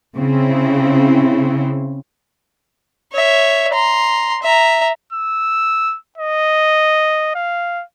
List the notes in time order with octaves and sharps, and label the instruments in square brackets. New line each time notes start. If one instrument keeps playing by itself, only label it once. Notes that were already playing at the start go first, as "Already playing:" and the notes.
[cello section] C#3 C4 E4
[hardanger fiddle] C#5 E5
A#5 C6
E5 A#5
[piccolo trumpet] E6
D#5
F5